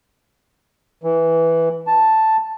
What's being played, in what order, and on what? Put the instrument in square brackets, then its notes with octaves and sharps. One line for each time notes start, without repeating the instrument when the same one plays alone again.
[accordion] E3
A5